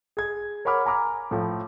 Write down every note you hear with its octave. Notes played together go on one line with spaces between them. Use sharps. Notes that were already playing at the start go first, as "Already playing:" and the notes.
G#4 G#6
A#4 C#5 F#5 B5 D6 F6
G#5 A#5 B5 D6 F6
A2 F3